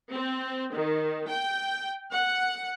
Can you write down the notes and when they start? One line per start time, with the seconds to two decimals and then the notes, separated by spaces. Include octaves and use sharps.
0.13 C4
0.74 D#3
1.28 G5
2.12 F#5